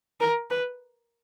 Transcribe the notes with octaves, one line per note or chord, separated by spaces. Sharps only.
A#4
B4